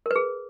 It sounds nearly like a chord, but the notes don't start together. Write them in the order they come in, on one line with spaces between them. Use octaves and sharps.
A#4 B4 G#4